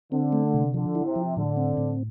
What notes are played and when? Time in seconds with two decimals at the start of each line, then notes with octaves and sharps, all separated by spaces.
0.12 D3 C4
0.32 A3
0.54 C3
0.74 D3 F3
0.95 E4
1.05 C3
1.16 F3
1.36 A2 D3
1.57 C4
1.77 A2